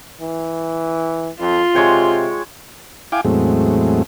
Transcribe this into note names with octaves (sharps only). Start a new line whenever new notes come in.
E3
F2 F4
C3 G#3 C#5 G5
E4 F5 G5 G#5 D6
E2 A2 F#3 G#3 A3 C4